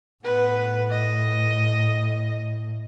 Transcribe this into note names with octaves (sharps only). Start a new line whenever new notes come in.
A2 B3 B4
D#5